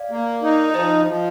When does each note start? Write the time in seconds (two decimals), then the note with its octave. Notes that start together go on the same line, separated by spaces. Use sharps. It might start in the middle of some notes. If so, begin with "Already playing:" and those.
Already playing: D5 F5
0.11 A#3
0.43 D#4
0.74 F3 C5 D#5
1.07 F3